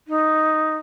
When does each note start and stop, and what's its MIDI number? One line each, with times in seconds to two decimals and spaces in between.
0.08 0.77 63